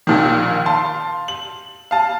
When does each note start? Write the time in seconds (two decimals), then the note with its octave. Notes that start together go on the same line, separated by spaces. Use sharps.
0.07 A#1 A#2 D#3
0.66 F5 A5 C6
1.28 F#7
1.91 F5 A5